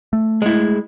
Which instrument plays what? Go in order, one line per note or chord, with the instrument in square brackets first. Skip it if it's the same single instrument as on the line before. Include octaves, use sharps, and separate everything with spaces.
[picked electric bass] A3
[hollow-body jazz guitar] G#3 E4